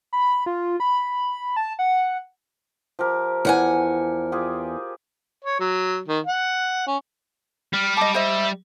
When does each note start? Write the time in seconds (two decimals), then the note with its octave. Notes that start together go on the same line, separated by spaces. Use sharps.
0.13 B5
0.46 F4
0.80 B5
1.56 A5
1.79 F#5
2.99 F3 G4 A#4
3.45 E2 A#4 F#5 G#5
4.32 F4 G4 G#4
5.45 C#5
5.59 F#3
6.08 D#3
6.26 F#5
6.87 C#4
7.73 G3 F6
7.97 D#5 A5 D6
8.14 C5 D#5 E5